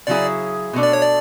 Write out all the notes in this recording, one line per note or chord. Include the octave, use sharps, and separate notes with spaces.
C#3 F#3 C#4 E4 G#4 D5
B2 A3 D4
D5
C#5
D5